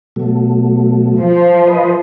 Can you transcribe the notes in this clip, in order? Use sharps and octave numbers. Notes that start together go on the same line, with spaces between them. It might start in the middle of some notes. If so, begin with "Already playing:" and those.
B2 F#3 A3
F3
B4 D#5